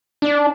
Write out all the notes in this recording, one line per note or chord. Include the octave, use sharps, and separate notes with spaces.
D4